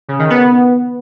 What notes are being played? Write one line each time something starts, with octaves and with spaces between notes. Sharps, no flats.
C#3
D#3
B3